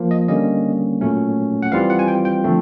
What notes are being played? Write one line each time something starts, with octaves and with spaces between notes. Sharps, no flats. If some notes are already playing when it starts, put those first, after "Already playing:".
Already playing: F3 A#3
D#5
D3 G3 A#3 C#4 D#5
A#2 F#3 A3 C#4
F#5
E3 G3 C4 F4 F5
F#5
G#5
G5
G5
D3 F3 A3 C4